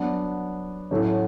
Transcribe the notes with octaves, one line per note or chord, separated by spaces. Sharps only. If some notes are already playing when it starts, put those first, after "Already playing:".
Already playing: F#3 B3 D4
A2 F#3 A3 C#4 E4